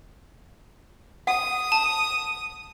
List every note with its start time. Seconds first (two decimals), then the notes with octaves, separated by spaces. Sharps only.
1.27 F#5 D#6
1.72 A5